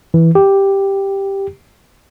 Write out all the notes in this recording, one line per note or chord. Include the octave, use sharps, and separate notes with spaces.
E3
G4